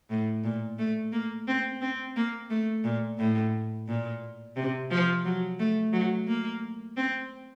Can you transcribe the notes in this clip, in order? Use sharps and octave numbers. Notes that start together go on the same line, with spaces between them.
A2
A#2
A3
A#3
C4
C4
A#3
A3
A#2
A2
A#2
C3
F3
F#3
A3
F#3
A#3
C4